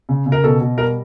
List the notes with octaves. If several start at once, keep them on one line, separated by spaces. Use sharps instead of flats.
C#3
C#3
A#4
B2 A4
B2
G3 A#4